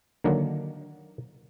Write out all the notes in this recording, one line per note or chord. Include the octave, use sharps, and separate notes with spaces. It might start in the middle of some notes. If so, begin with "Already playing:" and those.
D3 D#3 F#3 A#3